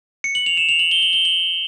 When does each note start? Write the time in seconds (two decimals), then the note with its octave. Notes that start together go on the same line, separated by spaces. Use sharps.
0.24 C#7
0.35 F#7
0.46 F7
0.57 E7
0.69 F7
0.79 F#7
0.91 G7
1.02 F#7
1.13 G7
1.25 F#7